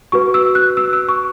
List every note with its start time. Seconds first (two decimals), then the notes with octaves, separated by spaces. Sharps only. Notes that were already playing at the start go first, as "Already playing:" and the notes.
0.12 F#4 B4 C#6
0.34 E6
0.55 F#6
0.77 E6
0.93 E6
1.09 C#6